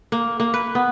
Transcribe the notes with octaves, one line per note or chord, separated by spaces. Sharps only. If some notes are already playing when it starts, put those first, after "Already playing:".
A#3
A#3
B4
B3